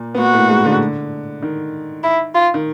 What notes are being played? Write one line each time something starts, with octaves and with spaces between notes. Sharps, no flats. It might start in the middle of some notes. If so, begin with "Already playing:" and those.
Already playing: A#2 A#3
B3
A#2 A#3 F#4
A2 A3
G#2 G#3
D3
D#3
E4
F4
D#3